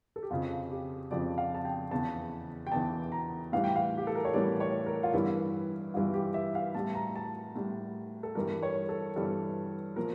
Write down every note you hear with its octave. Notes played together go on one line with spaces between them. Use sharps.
A4
G4
F2 C#3 F3 F4
G4
F2 C#3 F3 D5
F5
A5
G5
E2 C#3 E3 A5
G5
E2 C#3 E3 A5
A#5
A2 E3 G3 F5
G5
F5
G4
A4
A#4
C#5
A2 E3 G3 D5
C#5
A#4
F4
G2 E3 G3 E4
G2 E3 G3 F4
G4
E5
F5
A2 G3 A5
A#5
A5
A2 G3
A4
G2 E3 G3 A#4
C#5
A4
G2 E3 G3 A4
A#2 F3 A#4